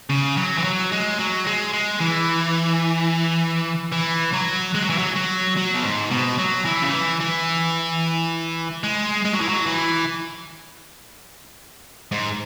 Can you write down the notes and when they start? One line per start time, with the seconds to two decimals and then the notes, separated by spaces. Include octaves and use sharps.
0.10 C#3
0.37 F#3
0.58 E3
0.64 F#3
0.92 G#3
1.19 F#3
1.47 G#3
1.73 G#3
2.01 E3
3.92 E3
4.33 F#3
4.75 G#3
4.82 F#3
4.90 E3
4.98 F#3
5.15 F#3
5.57 F#3
5.74 B2
5.83 G#2
6.11 B2
6.38 F#3
6.65 E3
6.82 C#3
6.92 E3
7.20 E3
8.84 G#3
9.25 G#3
9.33 F#3
9.41 E3
9.49 F#3
9.66 E3
12.12 G#2